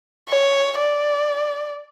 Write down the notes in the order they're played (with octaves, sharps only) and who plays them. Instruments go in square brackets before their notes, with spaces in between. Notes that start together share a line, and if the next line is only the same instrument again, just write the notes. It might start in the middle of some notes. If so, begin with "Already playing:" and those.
[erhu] C#5
D5